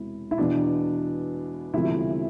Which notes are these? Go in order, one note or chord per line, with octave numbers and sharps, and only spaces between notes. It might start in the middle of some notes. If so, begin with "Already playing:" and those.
Already playing: E1 C3 E4
E4
E2 B2 D4
E1 D2 C3 F3 E4